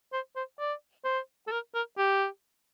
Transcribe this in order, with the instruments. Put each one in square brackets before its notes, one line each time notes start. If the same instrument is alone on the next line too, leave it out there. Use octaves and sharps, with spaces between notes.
[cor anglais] C5
C5
D5
C5
A4
A#4
A#4
G4